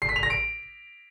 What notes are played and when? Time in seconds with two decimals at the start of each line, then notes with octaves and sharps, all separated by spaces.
0.02 C7
0.09 B6
0.16 F7
0.23 A#6
0.30 D7